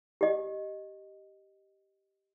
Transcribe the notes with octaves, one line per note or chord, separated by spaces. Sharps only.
G4 D#5